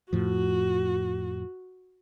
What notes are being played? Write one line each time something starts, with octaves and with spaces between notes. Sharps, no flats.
F2 A2 F3 F#4